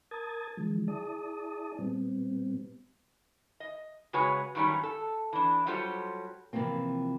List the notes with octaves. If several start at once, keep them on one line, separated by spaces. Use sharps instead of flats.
A#4 A5 D#6 G#6 A6
D3 E3 F3 G#3
E4 G#4 D5 A5 D#6
A#2 G3 B3 C4
D#5
C#3 G#3 F#4 B4 C#5 G#5
G2 D#3 F#3 G3 C#4
A4
E3 D4
F#3 G3 F4 G4 A4 C5
C3 E3 F3 A#3 C4